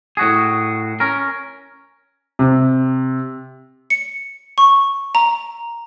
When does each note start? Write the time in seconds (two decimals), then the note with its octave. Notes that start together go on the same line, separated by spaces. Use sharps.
0.17 A2 F#4 G#4
1.00 C#4 A#4
2.39 C3
3.90 C#7
4.58 C#6
5.15 A#5